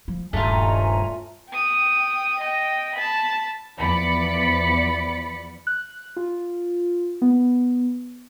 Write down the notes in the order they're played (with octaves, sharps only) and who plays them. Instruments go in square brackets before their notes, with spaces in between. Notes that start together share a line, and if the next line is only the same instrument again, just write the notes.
[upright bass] F3
[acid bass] D#1 [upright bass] G2 [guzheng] A3 F4 [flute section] G#5 A#5
[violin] G5 D#6
D#5 G5
A5 B5
[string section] E2 F3 D5 B5 C#7
[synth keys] F#6
F4
B3